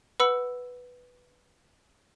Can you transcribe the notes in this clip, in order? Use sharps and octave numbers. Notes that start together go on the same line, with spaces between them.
B4 F#5 B5 E6 C#7